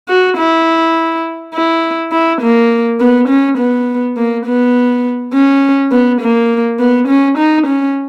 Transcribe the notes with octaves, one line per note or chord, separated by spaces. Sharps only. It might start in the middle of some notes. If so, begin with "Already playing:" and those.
F#4
E4
E4
E4
A#3
B3
C#4
B3
A#3
B3
C#4
B3
A#3
B3
C#4
D#4
C#4